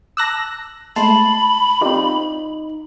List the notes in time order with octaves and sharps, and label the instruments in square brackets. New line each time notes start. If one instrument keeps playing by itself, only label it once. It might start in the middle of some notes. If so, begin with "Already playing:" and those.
[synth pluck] A5 D6 [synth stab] E6 F#6 A#6
[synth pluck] G#3 A3 [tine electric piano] A5 [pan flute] B5 [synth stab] C6
[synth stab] F3 C4 [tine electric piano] D#4 [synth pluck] F4 G4 D5